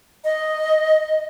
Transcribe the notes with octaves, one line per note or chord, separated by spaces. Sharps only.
D#5